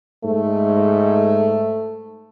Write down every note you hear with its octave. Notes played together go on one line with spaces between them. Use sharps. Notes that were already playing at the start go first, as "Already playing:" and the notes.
G#2 A3